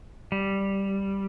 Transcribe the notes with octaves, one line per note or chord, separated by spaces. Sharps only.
G3